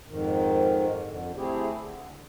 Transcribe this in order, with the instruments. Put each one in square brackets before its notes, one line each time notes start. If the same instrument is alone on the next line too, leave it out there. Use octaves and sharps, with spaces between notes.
[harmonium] F2 G#2 D#3
F2 D3
A3 C4 E4 G4 G#4
D3